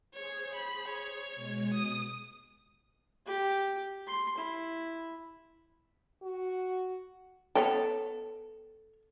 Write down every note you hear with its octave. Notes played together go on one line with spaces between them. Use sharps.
G#4 C5 C#5
B5
C#5
B2 G#3
D#6
G4
C6
E4
F#4
B3 A4 C#5 G5